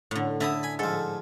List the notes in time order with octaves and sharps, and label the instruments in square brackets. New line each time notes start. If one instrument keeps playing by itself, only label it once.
[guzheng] A2 D3
[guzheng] D3 E4 [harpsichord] E5 A5 D#6
[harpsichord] G#5 B5
[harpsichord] G#2 F3 [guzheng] A4